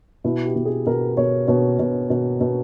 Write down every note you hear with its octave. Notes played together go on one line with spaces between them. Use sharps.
B2 E4
G4
B2
G#4
B2 A#4
B2 C#5
B2 C#5
B2
B2
B2